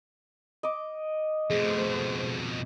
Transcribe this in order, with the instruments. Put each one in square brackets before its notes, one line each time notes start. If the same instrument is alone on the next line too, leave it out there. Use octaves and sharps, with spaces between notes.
[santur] D#5 D6
[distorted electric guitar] F2 B2 [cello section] A3 C5 [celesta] G#4